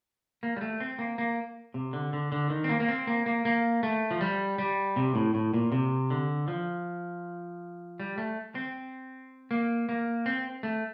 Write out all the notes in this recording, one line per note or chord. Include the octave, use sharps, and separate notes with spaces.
A#3
G3
A3
C4
A#3
A#3
C3
D3
D3
D3
D#3
C4
A#3
A#3
C4
A#3
A#3
A#3
A3
F3
G3
G3
C3
A2
A2
A#2
C3
D3
F3
G3
A3
C4
A#3
A#3
C4
A3